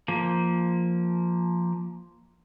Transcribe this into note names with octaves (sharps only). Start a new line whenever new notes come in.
F3 A#3